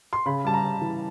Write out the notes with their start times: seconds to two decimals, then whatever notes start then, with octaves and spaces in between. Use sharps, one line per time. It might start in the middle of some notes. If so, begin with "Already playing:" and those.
0.13 C6
0.26 C#3 B5
0.44 G3 A5
0.54 A#5
0.63 C#3
0.82 E3